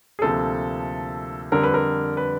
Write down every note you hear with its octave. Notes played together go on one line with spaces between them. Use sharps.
G#4
D2 C3 F3 A#3 A4
F2 D3 G3 A#4
B4
A#4
B4